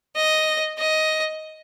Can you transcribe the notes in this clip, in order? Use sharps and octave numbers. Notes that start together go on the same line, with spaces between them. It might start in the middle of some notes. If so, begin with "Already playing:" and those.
D#5
D#5